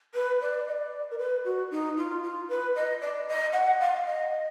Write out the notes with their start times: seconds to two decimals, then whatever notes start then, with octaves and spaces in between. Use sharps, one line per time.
0.14 B4
0.41 D5
0.67 D#5
0.71 D5
1.11 A#4
1.18 B4
1.44 F#4
1.71 D#4
1.97 F4
2.23 F4
2.49 B4
2.75 D#5
3.01 D5
3.28 D#5
3.53 F#5
3.80 F5
4.06 D#5